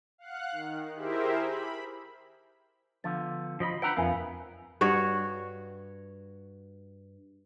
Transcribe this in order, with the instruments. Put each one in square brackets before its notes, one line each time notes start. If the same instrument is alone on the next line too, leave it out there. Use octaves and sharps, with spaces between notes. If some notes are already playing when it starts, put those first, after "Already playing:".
[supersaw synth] F5 F#5 F#6
D#3
E4 G4 G#4 A#4 C5 E5
B5
[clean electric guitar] D3 F3 B3 [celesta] F5 A6
[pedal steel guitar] F3 D#5 B5
[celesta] D4 E6 G6 [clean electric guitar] B4 F#5 A#5 [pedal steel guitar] G5 B5
[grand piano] F2 G#5 [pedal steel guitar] B3 [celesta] A#4 B4 E5 [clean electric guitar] F5
[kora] G2 F#4 C#5